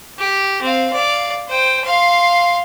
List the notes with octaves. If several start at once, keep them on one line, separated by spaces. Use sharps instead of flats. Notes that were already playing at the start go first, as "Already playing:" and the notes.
G4
C4 F5
D5 F5
C5 G5
F5 C6